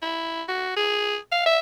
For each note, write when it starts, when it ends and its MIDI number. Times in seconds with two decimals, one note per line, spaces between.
0.02 0.42 64
0.48 0.74 66
0.77 1.17 68
1.32 1.43 77
1.46 1.60 76